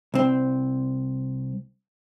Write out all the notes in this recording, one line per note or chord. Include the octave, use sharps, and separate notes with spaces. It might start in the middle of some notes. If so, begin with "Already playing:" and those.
C2 C4